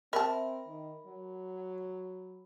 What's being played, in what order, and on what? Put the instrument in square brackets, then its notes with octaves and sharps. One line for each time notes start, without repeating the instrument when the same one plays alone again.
[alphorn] C4 [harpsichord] A#4 [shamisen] E5 A5 [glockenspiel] B5
[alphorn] D#3
F#3